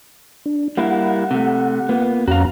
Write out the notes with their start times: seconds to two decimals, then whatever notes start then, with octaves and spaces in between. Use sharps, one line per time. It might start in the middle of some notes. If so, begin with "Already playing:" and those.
0.46 D4
0.77 G3 A#3 E4 F#5
1.31 C3 A3
1.89 A#3 B3 F4
2.28 F2 C#4 F#4 F5 A#5